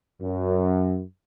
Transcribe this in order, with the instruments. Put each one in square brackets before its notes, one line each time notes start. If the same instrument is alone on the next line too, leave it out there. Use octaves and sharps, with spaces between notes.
[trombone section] F#2